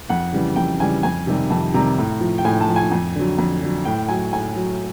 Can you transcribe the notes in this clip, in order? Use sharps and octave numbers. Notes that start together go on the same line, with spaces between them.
F2 F#5
C#3 E3 G3
F2 G5
C#3 E3 G3 G#5
F2 G#5
C3 D#3 G3
F2 A5
C3 D#3 G3 A#5
A2
F3
G5
A2 G#5
A5
F3
G#5
F2
D3 F#3
F2
D3 F#3
A2 G5
F#3 G#5
A2 G#5
F#3